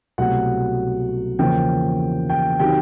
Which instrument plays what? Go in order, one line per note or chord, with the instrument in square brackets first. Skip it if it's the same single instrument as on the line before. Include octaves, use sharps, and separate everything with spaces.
[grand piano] C2 B2 F#3 A3 F#5
E2 C#3 F3 A#3 G5
G5
C3 D#3 F#3 G5